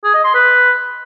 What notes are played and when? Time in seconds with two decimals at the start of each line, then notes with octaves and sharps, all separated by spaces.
0.04 G#4
0.14 D#5
0.24 C6
0.35 B4